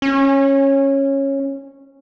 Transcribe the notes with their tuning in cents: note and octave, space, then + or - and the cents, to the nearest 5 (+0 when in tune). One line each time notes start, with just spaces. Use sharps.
C#4 -15